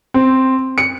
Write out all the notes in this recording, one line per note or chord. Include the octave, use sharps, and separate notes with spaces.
C4
C#7